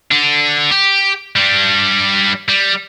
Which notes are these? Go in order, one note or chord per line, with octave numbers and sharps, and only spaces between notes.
D3 D4
G4
G3 D4
G3